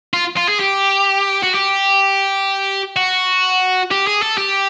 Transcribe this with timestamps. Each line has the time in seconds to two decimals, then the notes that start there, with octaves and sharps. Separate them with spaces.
0.13 F4
0.37 F4
0.49 G#4
0.61 G4
1.43 F#4
1.55 G4
2.96 F#4
3.91 G4
4.07 G#4
4.22 A4
4.38 G4